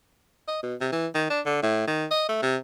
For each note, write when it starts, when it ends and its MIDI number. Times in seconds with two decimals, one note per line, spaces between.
0.48 0.63 75
0.63 0.75 47
0.81 0.88 48
0.92 1.07 52
1.15 1.26 51
1.30 1.41 62
1.46 1.62 50
1.63 1.86 45
1.87 2.06 51
2.11 2.24 75
2.29 2.41 57
2.42 2.57 48